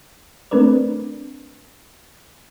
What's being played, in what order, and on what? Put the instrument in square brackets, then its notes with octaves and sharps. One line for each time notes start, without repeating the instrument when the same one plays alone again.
[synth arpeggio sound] A3 C4 D4 A#4 B4 D5